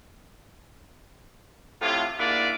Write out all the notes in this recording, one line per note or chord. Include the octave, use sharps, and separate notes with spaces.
A2 C3 F4
G#2 A#3 D4 E4 F4 D5